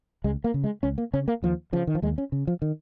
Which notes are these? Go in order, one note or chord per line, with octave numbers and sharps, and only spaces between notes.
C#2 G#3
A#3
C#3
G#3
C#2 C#4
A#3
C#3 C#4
A#3
D#2 F3
C#3 F3
D#3
F3
D#2 G#3
C#4
C#3
F3
D#3